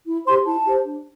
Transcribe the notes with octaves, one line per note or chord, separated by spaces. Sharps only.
E4
G4 C5 C6
E4 A5
G4 C5
D4